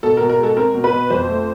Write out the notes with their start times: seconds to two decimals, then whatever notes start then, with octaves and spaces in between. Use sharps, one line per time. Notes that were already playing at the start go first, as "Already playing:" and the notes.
0.03 B2 A4
0.17 A#4
0.21 B2
0.29 A#4
0.39 G#3 A4
0.56 C4 A#4
0.74 B2
0.84 B4
0.93 B2
1.10 F2 C5
1.28 A3